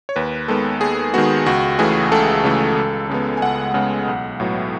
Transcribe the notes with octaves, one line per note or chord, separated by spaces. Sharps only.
C#5
D#2 B4
D#3 G#3 B3 A4
D#2 G#4
D#3 G#3 B3 F#4
C#2 F#4
C#3 E3 A3 G#4
C#2 A4
C#3 E3 A3
C#2
C#3 G#3 B3
G#5
C#2 F#5
C#3 G#3 B3
B1
A2 F#3 B3